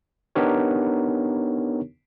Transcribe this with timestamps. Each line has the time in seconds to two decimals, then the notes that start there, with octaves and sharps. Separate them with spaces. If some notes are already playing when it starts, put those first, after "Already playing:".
0.35 B3 D4 D#4 G4 A#4 C#5